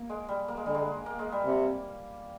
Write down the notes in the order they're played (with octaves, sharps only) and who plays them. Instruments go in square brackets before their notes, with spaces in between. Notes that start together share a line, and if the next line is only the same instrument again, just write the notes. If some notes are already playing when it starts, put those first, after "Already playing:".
Already playing: [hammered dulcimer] A#3
G#3
G3
A#3
G#3
[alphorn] D3 [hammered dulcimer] G3
[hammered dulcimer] G#3
A#3
G#3
G3
[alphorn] C3